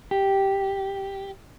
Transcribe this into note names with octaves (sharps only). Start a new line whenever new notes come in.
G4